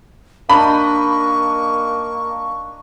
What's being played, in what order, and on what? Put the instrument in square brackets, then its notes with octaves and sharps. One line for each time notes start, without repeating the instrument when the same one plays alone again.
[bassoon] A#3 [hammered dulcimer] D4 D#4 D#5 [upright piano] B5 [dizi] C#6